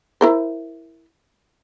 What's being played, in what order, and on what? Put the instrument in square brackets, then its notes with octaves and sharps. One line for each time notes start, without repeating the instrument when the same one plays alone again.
[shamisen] E4 A#4 C5